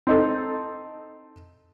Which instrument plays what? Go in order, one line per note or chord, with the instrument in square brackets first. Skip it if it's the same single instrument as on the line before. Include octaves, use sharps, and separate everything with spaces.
[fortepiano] C4 D#4 A4